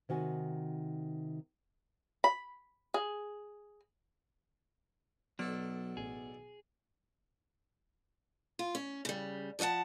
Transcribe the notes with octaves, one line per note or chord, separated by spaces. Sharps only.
C3 D#3 F#4 G#5
B5
G#4
B1 F#3 B3 A4 D5
A1 G#4
F4
C#4
C#3 G3
F3 C5 D#5 F#5 A5